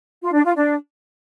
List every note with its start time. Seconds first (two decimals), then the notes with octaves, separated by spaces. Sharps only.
0.22 F4
0.33 D4
0.44 F4
0.55 D4